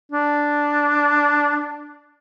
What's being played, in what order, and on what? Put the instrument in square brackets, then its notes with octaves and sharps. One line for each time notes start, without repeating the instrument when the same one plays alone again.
[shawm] D4